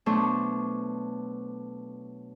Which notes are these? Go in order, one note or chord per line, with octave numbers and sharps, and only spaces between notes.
B2 F#3 A3 D4 C5 C#6